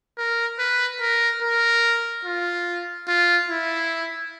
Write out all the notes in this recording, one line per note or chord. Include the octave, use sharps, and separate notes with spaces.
A#4
B4
A#4
A#4
F4
F4
E4